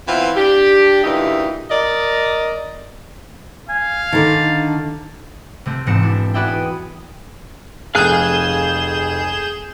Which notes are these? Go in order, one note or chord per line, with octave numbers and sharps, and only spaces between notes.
E3 B3 C4 E4 F4
D4 G4
D2 A#2 E3 D#4 E4 G4
A#4 D5 D#5
F5 G#5
D3 D#3 A5
C3 A3 C4
E1 G#2 C4 A#6 C#7 E7
D4 E4
F#4 G#4 B4 D5 E5 G5
D#6
F1 F2 G#4 F5 G#5 F#6 G6 E7